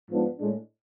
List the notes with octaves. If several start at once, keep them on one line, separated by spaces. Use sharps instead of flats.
G#2 F3 B3 D4
A2 G#3 D4